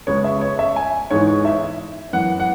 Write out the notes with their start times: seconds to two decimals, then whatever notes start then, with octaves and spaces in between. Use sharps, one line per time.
0.07 C#2 C#3 G#3 B3 C#5
0.24 E5
0.41 C#5
0.59 E5
0.76 G#5
1.10 G#2 E3 G#3 B3 C#5
1.28 C#5
1.45 E5
2.13 F#2 E3 B3 F#5
2.40 F#5